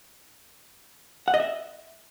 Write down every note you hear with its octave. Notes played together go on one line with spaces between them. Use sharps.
F#5
D#5
E5